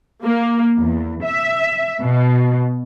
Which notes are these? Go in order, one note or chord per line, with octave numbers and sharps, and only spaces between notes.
A#3
E2
E5
B2